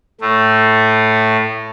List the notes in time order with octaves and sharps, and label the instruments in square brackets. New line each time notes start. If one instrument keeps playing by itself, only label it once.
[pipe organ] A2 A3